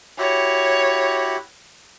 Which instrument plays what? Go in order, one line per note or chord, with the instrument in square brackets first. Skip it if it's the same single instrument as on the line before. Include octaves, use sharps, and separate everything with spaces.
[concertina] E4 F#4 G4 [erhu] C#5